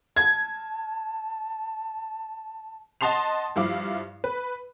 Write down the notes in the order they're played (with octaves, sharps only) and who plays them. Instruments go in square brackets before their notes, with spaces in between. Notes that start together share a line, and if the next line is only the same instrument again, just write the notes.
[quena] A5 [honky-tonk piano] G#6
[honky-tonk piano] D#5 F#5 A5 C6 C7 F7
G2 F3 E4 F5 D6
B4